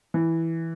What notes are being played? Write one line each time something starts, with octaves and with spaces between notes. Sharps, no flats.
E3